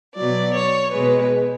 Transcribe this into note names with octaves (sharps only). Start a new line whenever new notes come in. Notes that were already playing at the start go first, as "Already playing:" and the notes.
B2 F#3 D5
C#5
B2 G#3 B4